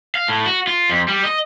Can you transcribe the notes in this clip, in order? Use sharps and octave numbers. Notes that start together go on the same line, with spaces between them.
F5
A2
F#4
F4
F2
G3
D#5